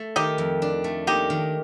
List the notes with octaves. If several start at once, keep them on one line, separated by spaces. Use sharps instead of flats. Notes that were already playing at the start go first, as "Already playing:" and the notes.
Already playing: A3
D#3 D#4 G4
F2
D4
A3
A#3 D#4 G4
D#3